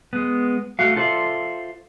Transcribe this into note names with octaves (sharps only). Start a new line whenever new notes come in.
G#3 B3
A3 F#4 F5
F4 A4 C5 D5 E5 F5